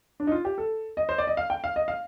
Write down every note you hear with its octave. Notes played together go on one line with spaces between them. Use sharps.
D4
D#4
F4
G4
A4
D#5
C5
D5
D#5
F5
G5
F5
D#5
F5